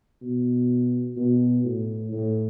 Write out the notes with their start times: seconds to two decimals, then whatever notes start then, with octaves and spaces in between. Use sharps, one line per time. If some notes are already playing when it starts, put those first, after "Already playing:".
0.21 B2
1.16 B2
1.65 A2
2.12 A2